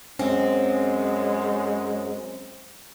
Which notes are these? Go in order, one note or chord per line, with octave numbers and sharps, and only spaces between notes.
F#2 G#3 C4 C#4